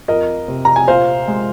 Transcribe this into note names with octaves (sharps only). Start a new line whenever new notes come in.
F2 A#4 D#5
C3
A#5
G#5
A#2 C5 F5
G#3